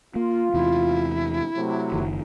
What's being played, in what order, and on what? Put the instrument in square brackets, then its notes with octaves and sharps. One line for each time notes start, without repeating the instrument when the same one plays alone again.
[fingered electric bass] A#3 [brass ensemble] F4
[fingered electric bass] E2 C3 [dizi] E4
[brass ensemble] C3 F#3 A3
[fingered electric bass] F#1 C2 D#3